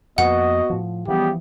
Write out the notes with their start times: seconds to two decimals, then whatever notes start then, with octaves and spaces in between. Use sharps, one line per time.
0.18 F2 A#3 B3 F#4 D#5 F#5
0.70 A2 F3
1.08 C#3 E3 F3 G3 B3 G4